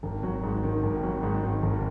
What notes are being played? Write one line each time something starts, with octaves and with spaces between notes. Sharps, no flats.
G#1
F#3
G#2
D#3
G#1
F#3
G#2
D#3
G#1